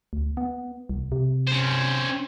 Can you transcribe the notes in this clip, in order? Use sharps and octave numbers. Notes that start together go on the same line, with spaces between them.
D2
B3
C2
C3
C#4 C5